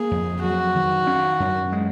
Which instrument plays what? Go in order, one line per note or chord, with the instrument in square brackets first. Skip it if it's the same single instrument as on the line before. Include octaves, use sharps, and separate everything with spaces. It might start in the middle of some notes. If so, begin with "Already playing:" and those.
Already playing: [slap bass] A#3 [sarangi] G#4
[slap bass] F2
[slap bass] F#3 [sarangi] F#4
[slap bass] D#3
C#4
F#2
G#3